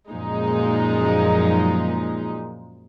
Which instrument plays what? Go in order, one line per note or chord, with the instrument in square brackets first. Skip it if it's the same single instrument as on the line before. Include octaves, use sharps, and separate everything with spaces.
[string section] F#2 A#2 F3 G#3 D#4